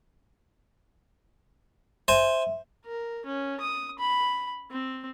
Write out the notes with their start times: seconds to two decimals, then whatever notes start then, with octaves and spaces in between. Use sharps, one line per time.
2.08 C5 E5 G#5
2.85 A#4
3.25 C#4
3.60 D#6
3.99 B5
4.71 C4